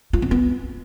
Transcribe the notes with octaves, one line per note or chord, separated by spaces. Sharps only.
F4
C4
B3